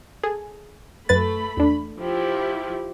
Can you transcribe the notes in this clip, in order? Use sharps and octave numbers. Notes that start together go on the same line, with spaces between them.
G#4 A4
F#2 A3 B4 B5 A6
E2 D4
F3 E4 G4